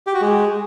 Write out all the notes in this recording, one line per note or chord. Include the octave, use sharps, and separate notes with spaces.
G4
F#4
G#3